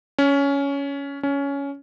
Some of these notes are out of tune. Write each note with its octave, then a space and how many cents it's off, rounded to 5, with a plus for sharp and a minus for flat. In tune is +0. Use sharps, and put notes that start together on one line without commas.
C#4 +15
C#4 +15